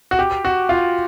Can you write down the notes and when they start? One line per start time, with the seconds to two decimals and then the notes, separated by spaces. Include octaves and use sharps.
0.11 F#4
0.19 G4
0.45 F#4
0.69 F4